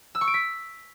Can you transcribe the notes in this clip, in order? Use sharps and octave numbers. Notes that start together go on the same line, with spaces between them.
E6
C#6
D7
B6